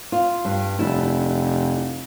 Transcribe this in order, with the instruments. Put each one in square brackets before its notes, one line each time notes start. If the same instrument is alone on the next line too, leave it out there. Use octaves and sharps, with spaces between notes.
[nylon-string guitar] F4
G2
[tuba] F1 [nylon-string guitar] D4 E4